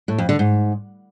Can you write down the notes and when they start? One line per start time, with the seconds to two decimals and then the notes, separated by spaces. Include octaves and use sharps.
0.08 A2
0.18 F2
0.29 D3
0.39 G#2